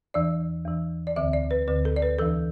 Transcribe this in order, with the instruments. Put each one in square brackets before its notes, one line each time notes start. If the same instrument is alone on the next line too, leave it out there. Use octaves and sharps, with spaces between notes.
[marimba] E2 E3 D5
E2 E3
D5
D2 D3 E5
D5
B4
D2 D3 B4
A4
D5
B4
E2 E3 A4